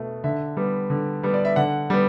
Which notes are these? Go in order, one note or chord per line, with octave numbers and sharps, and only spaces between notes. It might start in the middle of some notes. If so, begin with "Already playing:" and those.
Already playing: B2 A3
D3 E5
G3 B3
D3
G3 B3
D5
E5
D3 F#5
G3 B3